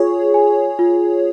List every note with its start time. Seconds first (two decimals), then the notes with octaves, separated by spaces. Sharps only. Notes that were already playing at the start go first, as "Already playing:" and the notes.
Already playing: F4 G#4 C#5
0.34 G#5
0.79 F4